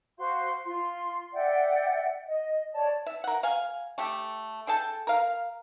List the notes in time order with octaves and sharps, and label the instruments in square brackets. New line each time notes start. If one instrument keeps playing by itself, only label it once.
[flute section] F#4 C5 F5 C6
F4 C6
D5 E5 F#5 G5
D#5
C#5 D5 A5
[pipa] E5
A#4 F#5
F5 G#5
A3 G4 A4
G#4 A4 G5 A5
A#4 F5